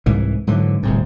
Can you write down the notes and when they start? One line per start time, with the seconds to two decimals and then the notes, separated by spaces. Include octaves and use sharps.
0.06 C2 G#2 E3
0.47 G#2 D3 E3 F#3
0.83 D1 C2 G#2